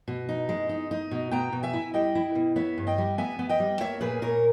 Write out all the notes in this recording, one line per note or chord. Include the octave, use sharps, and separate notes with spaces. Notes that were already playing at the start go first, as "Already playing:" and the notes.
B2
D#4
G#3
D#4
D#4
B2
B3 G5 A#5
B2
E5 G#5
E4
G3 D#5 G5
E4
B2
B3 C#5 E5
G2
D#5 G5
G3
B3 E5 G#5
B3
D#5 G5
G3
A#3 C#5 E5
A#2 G#4 B4
A#2 A#4 C#5